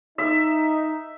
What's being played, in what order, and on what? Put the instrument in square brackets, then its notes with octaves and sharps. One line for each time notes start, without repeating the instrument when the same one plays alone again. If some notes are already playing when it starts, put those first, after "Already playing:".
[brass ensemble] D#4 [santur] E5